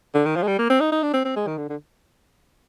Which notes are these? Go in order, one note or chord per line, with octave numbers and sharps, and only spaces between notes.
D3
D#3
F3
G#3
G3
A#3
C4
D#4
D#4
D4
C4
C4
G#3
D#3
D3
D3